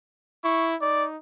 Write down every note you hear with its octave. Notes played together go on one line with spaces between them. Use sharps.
E4 C#6
D#4 D5